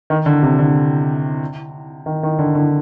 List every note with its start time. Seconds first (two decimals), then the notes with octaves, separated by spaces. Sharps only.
0.10 D#3
0.26 D3
0.43 C3
0.59 D3
2.06 D#3
2.23 D#3
2.39 D3
2.55 D3